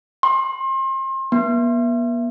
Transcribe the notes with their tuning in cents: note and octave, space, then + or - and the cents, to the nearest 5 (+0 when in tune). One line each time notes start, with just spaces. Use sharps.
C6 +35
B3 -45